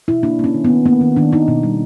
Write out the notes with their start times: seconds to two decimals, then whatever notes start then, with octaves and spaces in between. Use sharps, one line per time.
0.08 B2 E4
0.23 A#3 D4
0.39 A#3 C#4
0.55 D#3
0.64 B3
0.70 D#3
0.86 A#3 B3
1.01 D#3
1.16 D#3 D4
1.32 D#3 D#4
1.48 B2
1.63 G3